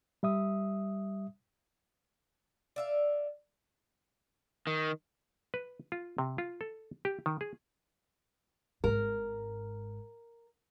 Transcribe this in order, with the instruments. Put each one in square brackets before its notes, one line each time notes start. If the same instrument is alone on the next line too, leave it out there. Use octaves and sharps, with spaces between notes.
[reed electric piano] G3 E5 D#6
[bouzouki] D5 E5 F5
[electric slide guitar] D#3
[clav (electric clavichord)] B4
F4
C3
F4
A4
G4
D#3
G#4
[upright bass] G#1 G#2 [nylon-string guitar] A#4